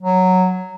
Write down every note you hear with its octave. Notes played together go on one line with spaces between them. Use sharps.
F#3